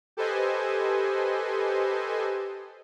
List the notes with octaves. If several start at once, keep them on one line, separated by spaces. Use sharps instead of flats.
G4 A4 B4 C5 D#5 G#5